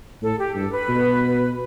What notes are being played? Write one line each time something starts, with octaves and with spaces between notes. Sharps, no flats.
A2 A4
G4
G2 A4
B4
B2